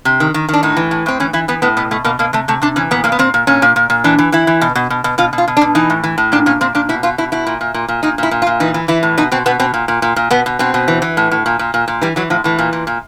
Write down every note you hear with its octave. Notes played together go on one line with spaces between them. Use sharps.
C3
D#3
D#3
D#3 D4
A2 D#4
E3
A2
A2 C4
E3 C#4
E3 E4
E3 B3
A2 B3
B2 B3
B2 A3
B2 A#3
B2 A#3
C3 A3
C3 A3
C3 D4
E3 C#4
A#2 B3
A#2 A#3
B3
A#2 C4
A#2
A#2 C#4
A#2
A#2
A#2
E3 D4
E3
E3 E4
E3
B2
B2
B2
B2
B2 F4
B2
F4
B2
D4
B2
E3 D#4
A2
E3
A2
A#2 D4
A#2 C#4
A#2 C4
A#2 D4
B2 E4
B2 F4
B2 E4
B2 E4
A#2
A#2
A#2
A#2
A#2 D#4
A#2
E4
A#2
F4
A#2
E3 D#4
E3
E3 E4
A2
B2 D#4
B2 C4
B2 B3
B2 C4
A#2
A#2
A#2
A#2
B2 B3
B2
B2 C4
B2
E3
E3
A2
A2
A#2
A#2
A#2
A#2
E3 G3
E3 F#3
A2 F3
A2 E3
A#2
A#2
A#2